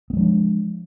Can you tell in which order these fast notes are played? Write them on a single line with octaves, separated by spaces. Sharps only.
B3 G#3 F3 D4